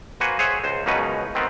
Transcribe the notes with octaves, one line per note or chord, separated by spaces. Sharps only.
A#3 F#4 B4 C5 F#5 G#5
G#4 C5 C#5 E5 F#5 G#5
C#2 C5
C#2 F#2 B2 C#4 D#4 B4
D#3 B3 C4